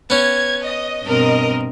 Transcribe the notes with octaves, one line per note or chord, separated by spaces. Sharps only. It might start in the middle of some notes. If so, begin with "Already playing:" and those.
B3 C#4 G#6
D#5
G2 B2 C4 A#4 D#5